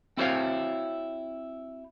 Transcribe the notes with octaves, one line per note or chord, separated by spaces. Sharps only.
C4 E4 F#4 C5 C#5 F5